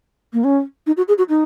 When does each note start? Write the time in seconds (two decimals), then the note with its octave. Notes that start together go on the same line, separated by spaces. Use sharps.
0.33 A#3
0.44 C#4
0.87 D#4
0.97 F#4
1.08 G#4
1.18 F#4
1.29 D#4